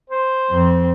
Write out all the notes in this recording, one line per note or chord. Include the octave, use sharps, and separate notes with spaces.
C5
F2 C4